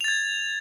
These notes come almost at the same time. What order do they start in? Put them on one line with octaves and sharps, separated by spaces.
F7 A6 G#6